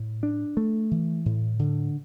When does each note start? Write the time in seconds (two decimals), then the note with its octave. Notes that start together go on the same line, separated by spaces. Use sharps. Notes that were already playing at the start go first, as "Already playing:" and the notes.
Already playing: A2
0.23 D4
0.57 A3
0.91 E3
1.26 A2
1.59 D3